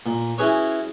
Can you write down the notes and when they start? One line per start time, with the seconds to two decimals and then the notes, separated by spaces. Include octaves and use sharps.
0.06 A#2
0.38 C#4 E4 F#4 G#4 B4 C#5